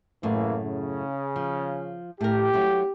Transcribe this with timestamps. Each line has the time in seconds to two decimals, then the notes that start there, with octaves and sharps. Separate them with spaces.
0.23 F#2 A2 C#3 E3 A#3
0.63 C#3
1.36 F3
2.21 A2 G4 A#4
2.53 F#3 A3 C4